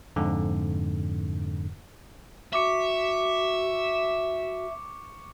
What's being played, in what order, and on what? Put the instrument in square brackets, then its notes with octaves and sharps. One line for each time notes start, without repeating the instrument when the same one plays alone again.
[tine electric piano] F2 G#2 D3
[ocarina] F#4 [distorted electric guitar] E5 [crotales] C#6 D6 C#7